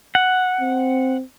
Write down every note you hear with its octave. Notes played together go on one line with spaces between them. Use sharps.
F#5
C4